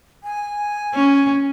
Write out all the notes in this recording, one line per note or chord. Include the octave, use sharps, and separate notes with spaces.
G#5
C#4